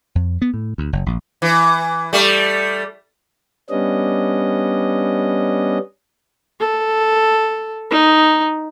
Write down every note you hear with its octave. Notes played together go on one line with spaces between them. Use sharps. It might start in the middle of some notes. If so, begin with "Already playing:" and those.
F2
B3
A2
D2
F#1
A#1
E3
G3 A3
G3 B3 C#4 D4 D#5
A4
D#4